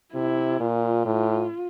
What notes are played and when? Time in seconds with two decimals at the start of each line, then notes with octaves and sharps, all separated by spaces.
0.14 C3 E4
0.60 A#2 F4
1.05 A2